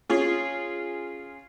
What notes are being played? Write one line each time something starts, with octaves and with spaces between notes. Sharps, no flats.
C#4 F4 G#4